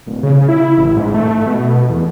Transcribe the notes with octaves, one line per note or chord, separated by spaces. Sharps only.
D1
C#3
E4
A1
G#2
A3
B2
E2